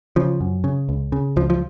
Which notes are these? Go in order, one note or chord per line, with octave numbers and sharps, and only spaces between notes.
C#3 F3
F#2
C#3
C#2
C#3
C#2 F3
F3